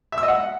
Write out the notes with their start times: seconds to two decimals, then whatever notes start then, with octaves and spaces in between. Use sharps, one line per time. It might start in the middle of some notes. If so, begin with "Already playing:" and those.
0.12 E5
0.18 E6
0.23 D#5
0.28 F#5